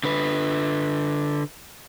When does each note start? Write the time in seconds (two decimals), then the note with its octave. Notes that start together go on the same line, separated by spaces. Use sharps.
0.04 D3 B4